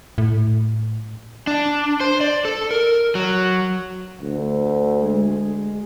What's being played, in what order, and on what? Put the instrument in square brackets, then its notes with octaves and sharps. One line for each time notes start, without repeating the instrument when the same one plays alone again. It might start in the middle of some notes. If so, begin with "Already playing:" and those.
[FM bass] A2
[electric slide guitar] D4
C5
D5
A4
A#4
F#3
[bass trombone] D2
[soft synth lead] G#3